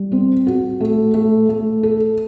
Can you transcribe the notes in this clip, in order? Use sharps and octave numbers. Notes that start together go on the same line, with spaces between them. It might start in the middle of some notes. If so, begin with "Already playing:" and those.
Already playing: G3
C4
F#4
A3
A3
A3
A4